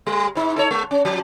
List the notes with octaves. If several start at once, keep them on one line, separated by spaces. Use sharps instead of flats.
G3
G#2 D#4
D#4 A4 C#5
G#3
C#4
F3